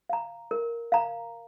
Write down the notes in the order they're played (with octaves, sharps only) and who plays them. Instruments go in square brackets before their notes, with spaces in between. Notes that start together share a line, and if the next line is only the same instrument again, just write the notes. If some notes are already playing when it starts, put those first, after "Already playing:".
[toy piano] F5 A#5
A#4
F5 A#5